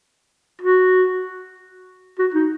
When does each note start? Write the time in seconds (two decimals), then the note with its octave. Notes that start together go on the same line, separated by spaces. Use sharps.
0.61 F#4
2.19 F#4
2.34 D#4